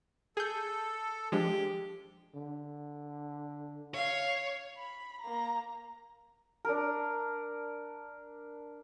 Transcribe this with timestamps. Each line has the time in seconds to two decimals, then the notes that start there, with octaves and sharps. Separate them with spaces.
0.37 G#4 A4 G6
1.32 F3 G#3 D4 G4
2.35 D3
3.94 C#5 F5
4.77 B5
5.21 A#3 A#5
6.65 D4 A#4